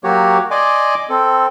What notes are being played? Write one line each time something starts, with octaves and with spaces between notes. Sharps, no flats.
F#3 A#3 F#4 G4 C#5
D5 D#5 G#5 C6 D6
C4 A4